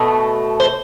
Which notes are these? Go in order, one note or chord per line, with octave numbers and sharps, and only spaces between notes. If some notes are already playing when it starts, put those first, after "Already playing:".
Already playing: B2 A3
C5